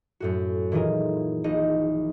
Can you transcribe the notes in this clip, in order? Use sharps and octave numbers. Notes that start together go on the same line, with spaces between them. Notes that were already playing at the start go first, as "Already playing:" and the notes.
F#2 A2 F#4
A#2 D#3 E3 F4 G#4 A#4
A#1 D#4 D#5